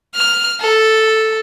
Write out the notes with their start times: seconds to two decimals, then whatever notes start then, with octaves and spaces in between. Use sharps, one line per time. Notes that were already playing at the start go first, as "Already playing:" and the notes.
0.15 F6
0.60 A4